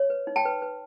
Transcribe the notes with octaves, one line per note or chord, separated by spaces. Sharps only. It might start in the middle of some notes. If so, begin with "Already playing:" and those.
Already playing: C#5
B4
D#4
G5 A5
B4
B4